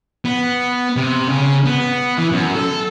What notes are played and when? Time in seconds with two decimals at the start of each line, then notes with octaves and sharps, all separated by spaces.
0.25 B3
0.96 C3
1.28 C#3
1.66 B3
2.18 E3
2.32 F#2
2.55 A4